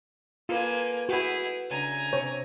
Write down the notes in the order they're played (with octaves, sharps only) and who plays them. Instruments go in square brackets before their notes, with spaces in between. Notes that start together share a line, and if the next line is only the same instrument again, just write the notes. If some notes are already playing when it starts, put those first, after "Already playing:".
[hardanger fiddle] A#3 G#5 [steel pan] F4 [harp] A4 B4
[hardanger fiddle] E4 G#4 [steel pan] F#4 B4 [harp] F#5 G6
[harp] C#3 D4 E5 [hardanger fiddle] G#5 A#5
[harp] C3 [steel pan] C#5